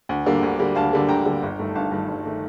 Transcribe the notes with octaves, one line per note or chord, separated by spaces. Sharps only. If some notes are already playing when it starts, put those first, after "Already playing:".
D2
D3 G3 A#3
D2
D3 G3 A#3
D2 F5 A5
D3 G3 A#3
D2 G5 A#5
D3 G3 A#3
G1
G2 D#3 A3
G1 F5 A5
G2 D#3 A3
G1
D#3 A3